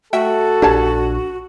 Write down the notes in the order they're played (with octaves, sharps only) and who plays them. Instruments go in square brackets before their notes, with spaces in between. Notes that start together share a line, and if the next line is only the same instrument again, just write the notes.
[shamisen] A3 E5 G5 [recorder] F#4 [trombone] A4
[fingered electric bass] A#1 D4 [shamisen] G4 C#5 A5